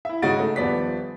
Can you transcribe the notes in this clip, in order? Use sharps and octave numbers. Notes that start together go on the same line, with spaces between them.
E4 E5
G#2 C#3 F#4 D#5 A6 D7
A3 D#4
D#1 F3 B3 D5 B6